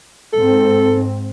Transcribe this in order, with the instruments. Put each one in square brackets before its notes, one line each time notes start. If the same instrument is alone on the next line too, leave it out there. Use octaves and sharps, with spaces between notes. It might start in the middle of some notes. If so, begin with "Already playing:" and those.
[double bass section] G#2 C4 [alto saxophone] A4